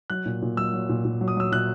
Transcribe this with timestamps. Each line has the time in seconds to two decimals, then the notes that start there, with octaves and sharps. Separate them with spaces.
0.10 F#3 F#6
0.26 A#2
0.42 A#2
0.57 F#3 E6
0.73 F#3
0.89 A#2
1.05 A#2
1.21 F#3
1.28 D#6
1.37 F#3 E6
1.52 A#2 F#6